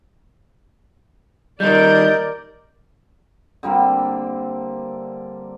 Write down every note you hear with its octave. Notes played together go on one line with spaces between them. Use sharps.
D#3 G3 A#4 D5 D#5 G6
D3 G3 A#3 C4